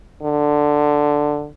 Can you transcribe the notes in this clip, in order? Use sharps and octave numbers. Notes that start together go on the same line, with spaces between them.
D3